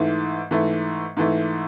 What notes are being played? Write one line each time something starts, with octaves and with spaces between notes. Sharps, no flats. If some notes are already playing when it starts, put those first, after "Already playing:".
Already playing: G#2 E3 A3
G#2 E3 A3
G#2 E3 A3